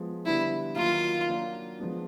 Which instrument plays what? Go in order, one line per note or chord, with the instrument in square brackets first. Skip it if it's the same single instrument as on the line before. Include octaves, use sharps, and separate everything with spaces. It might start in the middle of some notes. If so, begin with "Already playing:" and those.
Already playing: [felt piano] F3 G#3 B3
[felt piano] D3 G3 B3 D4 [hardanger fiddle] E4
[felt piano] D#3 F#3 A#3 D#4 [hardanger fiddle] F4
[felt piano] F#3 A#3 D4
F3 G#3 B3 D4